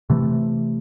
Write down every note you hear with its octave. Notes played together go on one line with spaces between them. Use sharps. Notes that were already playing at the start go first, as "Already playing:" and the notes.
C3 E3 A3